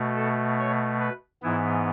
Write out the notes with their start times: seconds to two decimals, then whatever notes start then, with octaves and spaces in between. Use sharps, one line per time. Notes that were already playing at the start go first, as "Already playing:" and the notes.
Already playing: B2 A3
0.16 A4
0.59 C#5
1.00 B4
1.42 G#2 E3 B3 E4